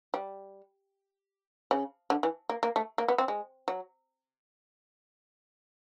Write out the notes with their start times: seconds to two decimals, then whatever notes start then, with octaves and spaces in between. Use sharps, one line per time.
0.14 G3
1.71 C#3
2.10 D3
2.23 E3
2.49 A#3
2.63 A#3
2.76 A3
2.98 A#3
3.08 B3
3.18 C4
3.28 G#3
3.68 F#3